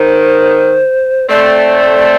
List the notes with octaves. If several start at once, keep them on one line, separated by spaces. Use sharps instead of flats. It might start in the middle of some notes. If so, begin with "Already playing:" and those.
Already playing: D#3 C5
A3 C4 D5